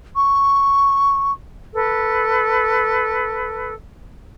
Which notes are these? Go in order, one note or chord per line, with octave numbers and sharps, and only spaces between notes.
C#6
A4 B4